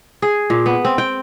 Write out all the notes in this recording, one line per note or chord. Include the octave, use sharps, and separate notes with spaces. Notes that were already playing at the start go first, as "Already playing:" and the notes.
G#4
A#2
B3
C4
G5